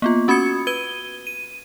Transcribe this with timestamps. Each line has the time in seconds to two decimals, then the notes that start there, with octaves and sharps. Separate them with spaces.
0.02 A#3 B3 F4
0.28 C#4 F#4 B5 D#6 G#6 C#7
0.67 B4 G#6 D#7 G7
1.27 D#7